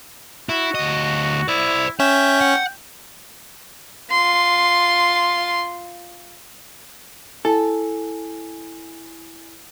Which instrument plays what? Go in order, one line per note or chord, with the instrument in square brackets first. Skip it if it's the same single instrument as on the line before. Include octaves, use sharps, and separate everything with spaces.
[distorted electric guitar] E4 [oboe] F#4
[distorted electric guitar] D2 D#5
[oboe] E4 [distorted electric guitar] C5 D5
[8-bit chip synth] C#4 [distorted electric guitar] E5 [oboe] G5
[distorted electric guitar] F#5
[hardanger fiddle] F4 C6
[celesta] E4 G#5 [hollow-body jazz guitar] A4